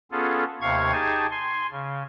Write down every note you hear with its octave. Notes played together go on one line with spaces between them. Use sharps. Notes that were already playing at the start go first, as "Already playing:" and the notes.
B3 C#4 F4 G#4 A4
D#2 C3 F5 C#6 G#6
D#4 G4 G#4 G#5 A5
G#5 C6
C#3